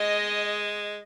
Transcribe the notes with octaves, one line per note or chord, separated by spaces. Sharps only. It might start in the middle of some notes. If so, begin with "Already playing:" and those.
Already playing: G#3 D#5